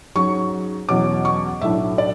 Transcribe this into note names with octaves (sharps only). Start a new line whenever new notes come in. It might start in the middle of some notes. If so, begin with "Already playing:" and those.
G#2 F#3 C#4 C#6
E2 B2 F#3 C#4 D6
C#6
B1 A2 F#3 A3 D4 E5
D5